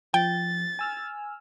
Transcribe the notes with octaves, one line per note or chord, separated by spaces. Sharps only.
F3 G5 A6
G#5 E6 F6